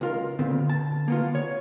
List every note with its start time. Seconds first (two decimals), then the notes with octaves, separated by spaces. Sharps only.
0.01 C#2 F4 A#4
0.39 A#2 D3 B3 C4
0.70 A5
1.08 A#3 B3 F4
1.35 C#5